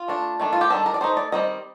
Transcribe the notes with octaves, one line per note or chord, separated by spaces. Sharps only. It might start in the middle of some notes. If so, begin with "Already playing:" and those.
Already playing: F4
A3 D4
D#3 A3 D4
F4
G4
D#3 G3 D4 A4
A#4
D5
A3 D#4 C5
D5
D#3 G3 C4 D#5